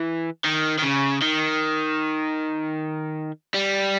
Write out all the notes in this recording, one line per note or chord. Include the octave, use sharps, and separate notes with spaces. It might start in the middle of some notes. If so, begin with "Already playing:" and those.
Already playing: E3
D#3
D#3
C#3
D#3
G3